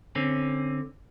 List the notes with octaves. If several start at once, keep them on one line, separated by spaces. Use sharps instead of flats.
D3 C4 C#4